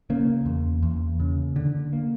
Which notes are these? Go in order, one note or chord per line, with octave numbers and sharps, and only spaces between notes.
C#3 A#3
E2
E2
C#3
D3
A#3